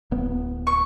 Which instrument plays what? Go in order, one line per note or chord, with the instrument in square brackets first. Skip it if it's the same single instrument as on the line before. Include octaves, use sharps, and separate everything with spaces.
[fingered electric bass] D1 B3
[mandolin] C#6